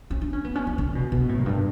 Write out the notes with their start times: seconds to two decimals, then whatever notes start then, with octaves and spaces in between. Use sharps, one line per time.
0.11 C#4
0.22 D4
0.33 C#4
0.44 B3
0.55 C#4
0.67 C#4
0.78 D3
0.95 B2
1.12 B2
1.29 A2
1.39 F#2
1.46 G2